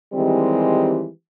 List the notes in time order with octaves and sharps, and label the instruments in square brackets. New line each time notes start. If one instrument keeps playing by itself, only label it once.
[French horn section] D#3 E3 G3 G#3 C4 G4